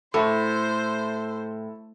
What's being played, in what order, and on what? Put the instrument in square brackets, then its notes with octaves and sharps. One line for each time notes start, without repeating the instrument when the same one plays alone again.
[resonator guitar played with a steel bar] A2 [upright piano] E4 A4 [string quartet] C5